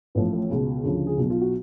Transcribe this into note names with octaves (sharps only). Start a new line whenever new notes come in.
A1 A2 F3 B3
A3
C#2 B2
D2 C#3 F3
G#4
B1 B2 F#4
F4
F#4